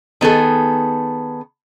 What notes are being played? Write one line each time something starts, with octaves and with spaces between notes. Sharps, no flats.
D#3 B3 G#4 A4